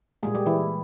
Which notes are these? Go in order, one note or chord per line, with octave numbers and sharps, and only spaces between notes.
A#2 G3 G#3 A#3 G#4
G3 G4
E3 E4